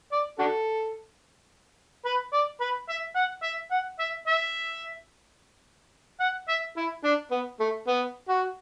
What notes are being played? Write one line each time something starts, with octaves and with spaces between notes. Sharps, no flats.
D5
D4 F#4 A4
B4
D5
B4
E5
F#5
E5
F#5
E5
E5
F#5
E5
E4
D4
B3
A3
B3
F#4